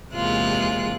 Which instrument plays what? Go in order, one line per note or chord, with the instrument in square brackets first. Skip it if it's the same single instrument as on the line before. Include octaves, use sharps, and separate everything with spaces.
[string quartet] E2 C3 G#3 A#3 F4 F#6